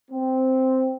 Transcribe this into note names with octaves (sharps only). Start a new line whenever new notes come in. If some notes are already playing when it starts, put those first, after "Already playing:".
C4